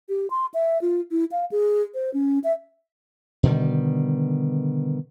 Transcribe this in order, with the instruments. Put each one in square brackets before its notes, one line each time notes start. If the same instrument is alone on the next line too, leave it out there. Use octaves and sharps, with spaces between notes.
[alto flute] G4
C6
E5
F4
E4
F5
G#4
C5
C#4
E5
[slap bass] B2 D3 D#3 G3